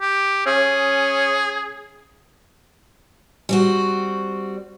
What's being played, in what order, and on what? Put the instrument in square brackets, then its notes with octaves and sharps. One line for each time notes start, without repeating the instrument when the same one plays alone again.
[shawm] G4
[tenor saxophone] C#4 [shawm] G#4
[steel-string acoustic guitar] G3 C4 F#4